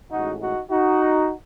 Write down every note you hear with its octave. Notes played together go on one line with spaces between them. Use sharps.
A1 A2 G#3 D#4 F#4
D#4 F#4
D#4 F#4